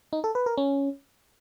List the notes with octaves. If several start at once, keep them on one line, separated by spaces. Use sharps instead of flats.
D#4
A4
B4
A#4
C#4